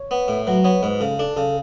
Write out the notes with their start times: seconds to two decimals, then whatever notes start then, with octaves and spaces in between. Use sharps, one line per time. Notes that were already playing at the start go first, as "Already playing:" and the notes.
Already playing: C#5
0.11 B3
0.28 A2
0.47 F#3 B4
0.64 B3 C#5
0.82 G#2 B4
1.00 C#3 A4
1.19 D4 A4
1.36 C#3 A4